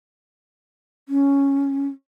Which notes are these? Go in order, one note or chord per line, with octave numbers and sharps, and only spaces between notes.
C#4